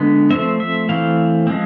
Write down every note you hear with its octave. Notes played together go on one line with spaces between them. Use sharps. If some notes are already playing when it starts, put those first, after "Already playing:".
Already playing: D3 G#3 B3
F3 A3 C4 E5
E5
E3 A3 C4 F5
F3 G#3 C4